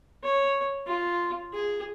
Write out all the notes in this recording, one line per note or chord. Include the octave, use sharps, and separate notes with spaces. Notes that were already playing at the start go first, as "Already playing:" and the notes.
C#5
F4
G#4